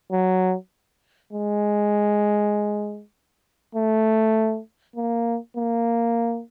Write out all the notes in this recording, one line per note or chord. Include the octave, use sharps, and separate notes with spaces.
F#3
G#3
A3
A#3
A#3